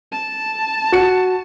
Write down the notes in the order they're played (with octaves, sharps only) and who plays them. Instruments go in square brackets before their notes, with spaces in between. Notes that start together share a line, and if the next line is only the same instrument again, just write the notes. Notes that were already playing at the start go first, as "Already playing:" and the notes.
[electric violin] A5
[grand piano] F#4 C#7